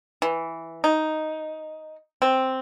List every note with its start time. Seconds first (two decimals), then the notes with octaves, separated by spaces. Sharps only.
0.22 E3
0.84 D#4
2.22 C4